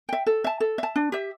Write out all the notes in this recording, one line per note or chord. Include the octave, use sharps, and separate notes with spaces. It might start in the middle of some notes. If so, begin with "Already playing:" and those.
E5 G5
A4
E5 A5
A4
E5 A5
D4
G4 E5